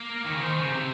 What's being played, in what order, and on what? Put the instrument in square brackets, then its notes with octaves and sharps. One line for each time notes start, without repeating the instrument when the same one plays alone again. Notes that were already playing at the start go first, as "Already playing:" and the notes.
Already playing: [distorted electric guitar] A#3
[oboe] A#4
[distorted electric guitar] D#3
C#3
[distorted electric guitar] D#3 [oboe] C5
[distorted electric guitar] C#3
C3